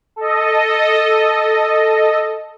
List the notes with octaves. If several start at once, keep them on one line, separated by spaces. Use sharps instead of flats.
A4 D#5